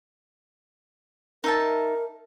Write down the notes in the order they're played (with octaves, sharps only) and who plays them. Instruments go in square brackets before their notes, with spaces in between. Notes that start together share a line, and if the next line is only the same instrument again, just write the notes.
[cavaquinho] D#4 E5 A5 [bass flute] A#4